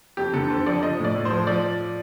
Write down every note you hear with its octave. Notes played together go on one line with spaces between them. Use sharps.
F2 G4
D3 A4
D3 C5
F3 D5
F3 D#5
A2
D5
A2
F3 C5
F3 D5